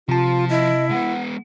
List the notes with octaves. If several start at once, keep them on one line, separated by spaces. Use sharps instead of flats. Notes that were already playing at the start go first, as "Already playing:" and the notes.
C3 F3 F4 A5
E4 D#5
G#3 B3 F#5